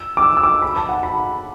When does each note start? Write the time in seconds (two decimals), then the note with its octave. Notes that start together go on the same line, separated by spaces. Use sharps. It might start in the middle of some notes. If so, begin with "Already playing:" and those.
Already playing: E6
0.17 D6
0.22 E6
0.37 E6
0.43 D6
0.62 B5
0.76 A5
0.89 F#5
1.03 B5